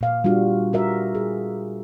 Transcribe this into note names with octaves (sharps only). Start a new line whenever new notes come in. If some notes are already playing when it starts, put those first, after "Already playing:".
A#2 F5
G3 D4 F4 F#4
F#4 A#4 E5
G#4